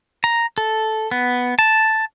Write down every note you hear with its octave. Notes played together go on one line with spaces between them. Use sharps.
A#5
A4
B3
A5